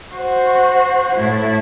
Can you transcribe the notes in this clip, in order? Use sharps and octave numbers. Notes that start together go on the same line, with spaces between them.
F#4 C5
A2 E4